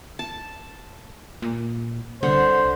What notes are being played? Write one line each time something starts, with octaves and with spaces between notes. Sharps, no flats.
A5
A#2
C2 D3 C5 F#5